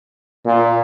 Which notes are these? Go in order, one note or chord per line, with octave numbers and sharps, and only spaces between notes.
A#2